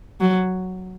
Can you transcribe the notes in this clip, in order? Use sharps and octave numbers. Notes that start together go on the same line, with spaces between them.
F#3